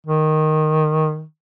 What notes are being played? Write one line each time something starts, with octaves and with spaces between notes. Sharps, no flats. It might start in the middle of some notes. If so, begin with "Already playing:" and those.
D#3